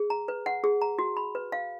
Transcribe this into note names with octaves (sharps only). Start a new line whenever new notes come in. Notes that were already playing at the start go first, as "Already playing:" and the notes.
Already playing: G#4
A#5
B4
F#5
G#4
A#5
F#4
B5
B4
F5